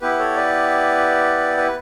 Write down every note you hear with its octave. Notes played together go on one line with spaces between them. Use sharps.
B3 E4 G4 B4
A4 C#5
B4 D5
B4